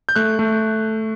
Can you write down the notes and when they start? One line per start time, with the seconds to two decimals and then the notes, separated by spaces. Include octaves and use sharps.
0.09 G6
0.16 A3 F#6
0.39 A3